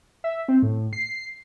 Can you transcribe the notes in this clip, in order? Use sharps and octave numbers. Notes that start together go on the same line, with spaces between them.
E5
C4
A2
C7